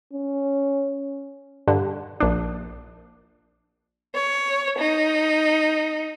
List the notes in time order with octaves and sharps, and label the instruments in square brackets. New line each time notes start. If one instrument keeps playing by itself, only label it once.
[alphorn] C#4
[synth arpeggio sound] G2 D3
A#1 D4
[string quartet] C#5
D#4